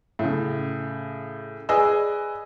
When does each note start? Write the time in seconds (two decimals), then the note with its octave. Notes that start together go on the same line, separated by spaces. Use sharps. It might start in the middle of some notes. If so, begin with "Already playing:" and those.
0.19 A2 C#3
1.69 G#4 B4 D5 D#5 G#5 E6